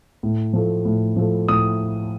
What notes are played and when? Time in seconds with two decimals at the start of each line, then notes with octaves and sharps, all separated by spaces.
0.23 A2
0.53 F3 A3
0.85 A2
1.17 F3 A3
1.48 A2 D#6